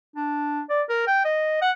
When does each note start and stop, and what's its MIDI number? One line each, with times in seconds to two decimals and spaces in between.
0.16 0.61 62
0.70 0.82 74
0.89 1.05 70
1.07 1.20 79
1.24 1.61 75
1.61 1.71 78